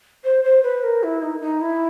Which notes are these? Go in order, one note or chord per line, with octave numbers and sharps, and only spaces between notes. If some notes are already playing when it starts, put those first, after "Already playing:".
C5
C5
B4
A#4
E4
D#4
D#4
E4